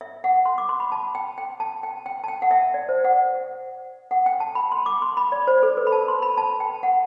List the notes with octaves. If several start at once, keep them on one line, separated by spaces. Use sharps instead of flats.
E5
F#5
C6
D6
C6
B5
A5
G5
G5
A5
G5
G5
A5
G5
F#5
E5
D5
C5
F#5
F#5
G5
A5
B5
C6
D6
C6
B5
D5
C5
A4
B4
B5
A5
C6
B5
A5
G5
F#5